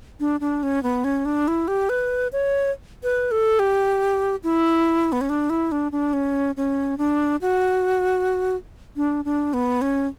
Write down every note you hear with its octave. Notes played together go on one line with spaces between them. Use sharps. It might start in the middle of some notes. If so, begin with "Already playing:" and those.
D4
D4
C#4
B3
C#4
D4
E4
G4
B4
C#5
B4
A4
G4
E4
B3
C#4
D4
E4
D4
D4
C#4
C#4
D4
F#4
D4
D4
B3
C#4